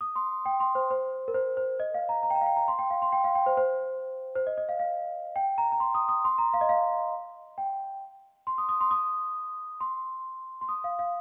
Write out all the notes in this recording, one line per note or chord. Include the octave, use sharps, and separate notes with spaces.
D#6
C6
G5
C6
C5
C5
A#4
C5
C5
D#5
F5
A#5
A#5
G5
A#5
F5
G5
A#5
C6
G5
F5
C6
G5
F5
G5
C5
C5
C5
D#5
D#5
F5
F5
G5
A#5
A#5
C6
D#6
D#6
C6
A#5
F5
D#5
F5
G5
C6
D#6
D#6
C6
D#6
C6
C6
D#6
F5
F5